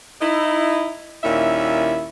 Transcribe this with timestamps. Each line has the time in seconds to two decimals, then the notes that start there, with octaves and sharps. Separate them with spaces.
0.21 D#4 E4
1.23 D#2 A#2 C#4 E4 E5